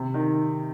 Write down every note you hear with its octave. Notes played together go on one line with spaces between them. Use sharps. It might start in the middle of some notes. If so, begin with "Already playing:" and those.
Already playing: C3
D#3